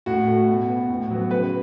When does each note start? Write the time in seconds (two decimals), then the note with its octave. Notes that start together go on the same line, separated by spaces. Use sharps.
0.06 A2 F#4
0.28 A3
0.48 B2
0.69 B3
0.90 A2
1.10 F#3 B3
1.31 C#3 B4